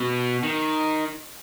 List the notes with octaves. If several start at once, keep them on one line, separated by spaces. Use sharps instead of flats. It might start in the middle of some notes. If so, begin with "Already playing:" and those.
Already playing: B2
D#3